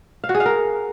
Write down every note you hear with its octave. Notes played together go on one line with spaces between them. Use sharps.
F5
F#4
G#4
F5
A#4